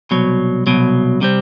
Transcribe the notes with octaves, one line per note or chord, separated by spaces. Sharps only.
C2 B2 F#3
C2 B2 F#3
C3 G3 C4